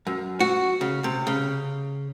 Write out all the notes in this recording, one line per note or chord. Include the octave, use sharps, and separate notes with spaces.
F#2
F#4
C#3
C3
C#3